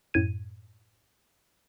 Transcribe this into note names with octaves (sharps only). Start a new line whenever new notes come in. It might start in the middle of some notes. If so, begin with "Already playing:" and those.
F#2 A2 G#6 D#7